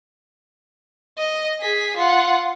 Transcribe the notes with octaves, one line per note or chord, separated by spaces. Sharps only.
D#5
G#4 B6
F4 F#5